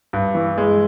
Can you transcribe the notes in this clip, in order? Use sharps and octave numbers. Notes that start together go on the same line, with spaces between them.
G2
E3
G#3